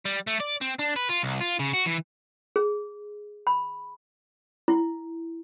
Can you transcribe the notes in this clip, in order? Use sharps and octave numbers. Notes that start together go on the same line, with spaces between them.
G3
A3
D5
C4
D4
B4
F4
C2
F4
C#3
F#4
E3
G#4
B5
E4